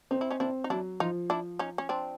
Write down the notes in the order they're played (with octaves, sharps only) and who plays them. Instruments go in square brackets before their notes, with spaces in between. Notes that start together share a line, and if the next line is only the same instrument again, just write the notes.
[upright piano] C4 [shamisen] D#4
[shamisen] E4
C#4 D#4
[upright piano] C4 [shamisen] D4 E4
[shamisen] D#4
[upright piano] F#3 [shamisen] D4 E4
[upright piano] F3 [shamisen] D#4 F4
[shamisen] D4 E4
C#4 D#4
C#4
C4 D4